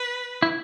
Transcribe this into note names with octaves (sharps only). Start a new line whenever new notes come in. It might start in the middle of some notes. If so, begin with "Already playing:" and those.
Already playing: B4
E4